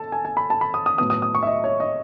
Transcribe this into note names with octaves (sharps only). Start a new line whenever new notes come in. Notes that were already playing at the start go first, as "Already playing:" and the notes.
Already playing: A4 A5
G#5
G#5
B5
A5
B5
D#6
D#6
A2 F#3 B3 D#6
D#6
D#6
C#6
E5
D#5
C#5
D#5